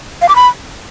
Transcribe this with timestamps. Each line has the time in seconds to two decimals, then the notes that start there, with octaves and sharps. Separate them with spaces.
0.22 F5
0.29 D6
0.36 B5